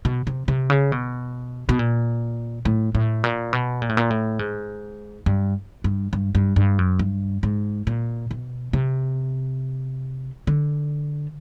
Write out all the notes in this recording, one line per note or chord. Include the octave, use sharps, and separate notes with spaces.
B2
C3
C3
C#3
B2
B2
A#2
A2
A2
A#2
B2
A#2
A2
A#2
A2
G#2
G2
G2
G2
G2
G2
F#2
G2
G#2
A#2
B2
C3
D3